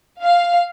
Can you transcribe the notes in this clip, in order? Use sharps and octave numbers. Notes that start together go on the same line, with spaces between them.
F5